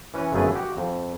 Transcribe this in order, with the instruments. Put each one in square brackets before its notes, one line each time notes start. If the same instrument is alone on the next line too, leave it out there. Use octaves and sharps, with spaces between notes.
[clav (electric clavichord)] E3 C#4 B4 C#5
G1 F#2 C#3 A3 G#4 B4
F#4 G4 F#5
F2